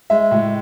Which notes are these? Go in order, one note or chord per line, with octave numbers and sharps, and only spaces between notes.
G#3 E5
A2